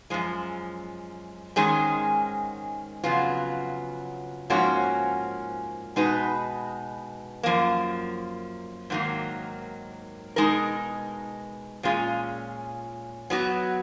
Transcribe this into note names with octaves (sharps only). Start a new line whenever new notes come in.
F#2 F3 G#3
G#2 D#3 G#3 C#4 G#4
F2 C#3 F#3 B3 F4
G#2 F3 A#3 C#4 F#4
B2 G#3 D#4 F#4 B4
F#2 F3 A#3
G#2 D#3 F#3 A#3
B2 G#3 D#4 A#4
A#2 G#3 C#4 F4 G#4
F#3 B3 F#4